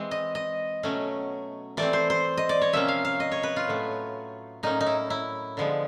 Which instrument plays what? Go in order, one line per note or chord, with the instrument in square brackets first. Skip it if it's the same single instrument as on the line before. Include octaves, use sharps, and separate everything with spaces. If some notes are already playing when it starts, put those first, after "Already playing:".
Already playing: [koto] E3 G#3 C4
D#5
D#5
B2 F#3 A3 C#4
E3 A3 C4 D5
C5
C5
D#5
D5
C#5
C3 F3 A#3 C#4 E5
F5
F5
D#5
C#5
B4
F4
A2 F#3 A3
A2 F#3 A#3 C#4 D#4
D#4
E4
E4
D3 F3 G#3 B3